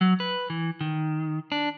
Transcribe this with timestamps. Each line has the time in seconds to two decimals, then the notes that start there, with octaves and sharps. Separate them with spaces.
0.01 F#3
0.20 B4
0.50 E3
0.81 D#3
1.52 D4